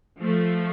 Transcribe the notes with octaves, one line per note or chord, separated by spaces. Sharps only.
F3 A3